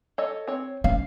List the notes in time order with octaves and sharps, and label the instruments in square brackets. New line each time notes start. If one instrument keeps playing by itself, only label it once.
[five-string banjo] A4 C#5 D#5
C4 C#5
[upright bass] C#4 [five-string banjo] F5